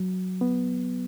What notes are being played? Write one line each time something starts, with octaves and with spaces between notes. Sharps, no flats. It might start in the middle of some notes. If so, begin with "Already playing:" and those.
Already playing: F#3
B3